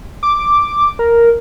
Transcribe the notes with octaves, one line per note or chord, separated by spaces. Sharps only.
D6
A#4